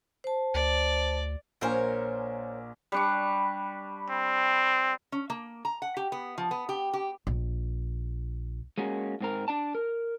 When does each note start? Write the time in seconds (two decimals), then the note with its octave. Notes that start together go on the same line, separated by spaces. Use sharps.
0.24 C5 A5
0.54 D2 D5
1.61 A#1 A#3 A#4 C5 C#5 G#5
2.92 G3 D4 C#6
4.10 C4
5.12 C#4
5.30 A#3
5.65 A#5
5.82 F#5
5.97 G4
6.12 B3
6.38 F3
6.51 B3
6.69 G4
6.94 G4
7.27 A#1
8.78 G#3 A#3 C#4 F#4
9.21 G#2 C4 A#4
9.48 D4 D5 A5
9.75 A#4